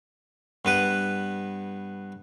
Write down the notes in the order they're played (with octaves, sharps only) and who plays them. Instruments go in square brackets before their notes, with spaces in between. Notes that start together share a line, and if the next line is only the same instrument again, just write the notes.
[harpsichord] G2 B3 B4